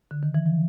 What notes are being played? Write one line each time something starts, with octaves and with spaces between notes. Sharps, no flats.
D3
D#3
E3
F3